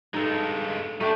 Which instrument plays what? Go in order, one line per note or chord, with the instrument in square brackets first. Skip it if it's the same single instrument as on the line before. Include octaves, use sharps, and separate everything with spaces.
[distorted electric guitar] G2 G#3 [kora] D#4 A4
[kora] A3 G5 [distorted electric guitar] D4 D#4